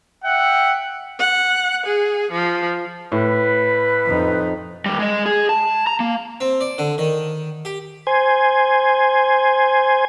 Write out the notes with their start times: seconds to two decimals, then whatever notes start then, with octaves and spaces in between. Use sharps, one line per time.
0.24 E5 F#5 G5
1.19 F#5
1.86 G#4
2.31 F3
3.12 A2 B4
4.06 F2 D#4
4.86 D#2 G3
4.99 G#3 D#5
5.26 G#4
5.49 A5
5.87 A#5
6.00 A#3
6.41 C4
6.61 D5
6.78 D3
6.98 D#3
7.65 G4
8.07 C5 G#5